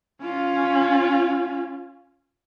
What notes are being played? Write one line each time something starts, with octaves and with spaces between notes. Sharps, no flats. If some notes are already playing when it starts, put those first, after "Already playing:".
C#4 F4